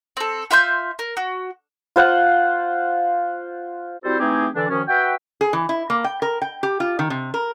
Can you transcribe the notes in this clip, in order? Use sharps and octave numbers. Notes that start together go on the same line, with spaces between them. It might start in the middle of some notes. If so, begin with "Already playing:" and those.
C4 A4
F4 E5 C6 G6
A#4
F#4
F4 C5 F#5
G3 C4 E4 F#4 A4 C5
E3 A3 C4 D#4 G4 G#4
D3 E3 D4
F#2 D#3 F3 C#4
F#4 B4 E5 G5
G#4
E3
E4
A#3
G5
A#4
G5
G4
F4
D#3
C3
A#4